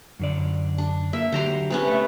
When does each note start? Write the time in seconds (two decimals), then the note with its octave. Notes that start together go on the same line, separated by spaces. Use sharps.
0.20 F#2 D3 D5
0.78 D4
1.13 A#3 E5
1.32 D3 F#3 G4 C5 A#5 C6
1.70 C3 B3 C#4
1.87 A3 E5